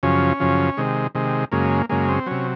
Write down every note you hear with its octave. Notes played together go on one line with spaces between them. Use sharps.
F#2 C#3 F3 C#4
F#2 C#3 F3
C3 D#3 G#3
C3 D#3 G#3
F#2 C#3 G#3 A#3
F#2 C#3 G#3 A#3
C4
C3 F#3 C#4